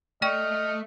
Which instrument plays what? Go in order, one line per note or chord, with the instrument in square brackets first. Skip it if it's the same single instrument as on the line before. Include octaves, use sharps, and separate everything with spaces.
[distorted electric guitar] A3 [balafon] D5 G5 C#6 [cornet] D#5 [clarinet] F6